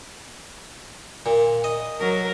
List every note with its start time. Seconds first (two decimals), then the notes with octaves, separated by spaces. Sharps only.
1.26 A#2
1.64 D#5
2.00 F#3 A#4